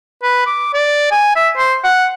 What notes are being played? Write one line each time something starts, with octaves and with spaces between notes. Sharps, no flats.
B4
D6
D5
G#5
E5
C5
F#5